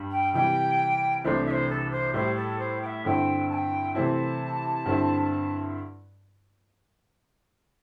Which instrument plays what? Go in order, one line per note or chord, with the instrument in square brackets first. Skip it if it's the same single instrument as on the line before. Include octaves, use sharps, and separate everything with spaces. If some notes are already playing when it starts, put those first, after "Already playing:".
Already playing: [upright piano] G2 G3
[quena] G5
[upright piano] C3 E3 G3 [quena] G5
[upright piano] C2 C3 E3 A3 D4 [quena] C5
[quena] E5
C5
A4
C5
[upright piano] A2 G3 E4 [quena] C5
[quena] A4
C5
G5
E5
[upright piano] G2 D3 C4 E4 [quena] G5
[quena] A5
G5
[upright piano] C3 E3 A3 C4 E4 [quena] A5
[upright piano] G2 D3 C4 E4